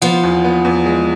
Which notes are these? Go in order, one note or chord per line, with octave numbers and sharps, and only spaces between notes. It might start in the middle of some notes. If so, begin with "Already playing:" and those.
F3 B3
E2
B3
E2
G#3